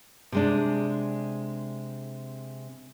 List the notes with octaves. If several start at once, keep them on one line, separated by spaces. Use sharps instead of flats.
C3 G#3 D4